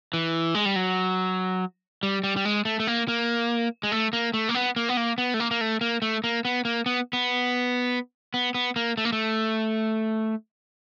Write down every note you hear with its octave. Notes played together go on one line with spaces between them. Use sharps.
E3
G#3
G3
F#3
G3
G3
G3
G#3
A3
A3
A#3
A#3
G#3
A3
A#3
A3
A#3
B3
A#3
B3
A#3
B3
A3
A#3
A#3
A3
A#3
A3
A#3
B3
A#3
B3
B3
B3
B3
A#3
A3
A#3
A3